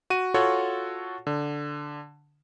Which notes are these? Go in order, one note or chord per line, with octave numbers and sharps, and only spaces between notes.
F#4 D#7
F4 F#4 A4 C#5 F#5
D3